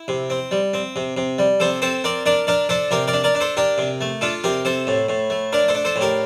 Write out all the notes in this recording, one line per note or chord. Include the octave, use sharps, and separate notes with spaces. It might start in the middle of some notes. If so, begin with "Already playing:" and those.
Already playing: E4
C3
C4
G3
C4
C3
C3
G3
C3 A4 C5
C4 A4 C5
C4 A#4 D5
D4 A#4 D5
D4 A#4 D5
D4 A4 C5
C3 G4 A#4
A#4 D5
D4
A#4 D5
D4
A4 C5
D4 G4 A#4
C3
A3
D4 F4 A4
C3 G4 A#4
C3 A4 C5
A2
A2
A3
D4 A#4 D5
A4 C5
D4
A4 C5
A2
G4 A#4